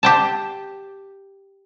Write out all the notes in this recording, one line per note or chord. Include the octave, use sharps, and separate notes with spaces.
G4 G5 A5